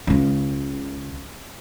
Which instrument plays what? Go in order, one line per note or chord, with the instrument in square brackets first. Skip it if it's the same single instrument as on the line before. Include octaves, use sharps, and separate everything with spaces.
[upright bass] C#2 C#3